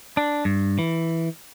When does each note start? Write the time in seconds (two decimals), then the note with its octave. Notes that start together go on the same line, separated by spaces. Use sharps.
0.17 D4
0.45 G2
0.79 E3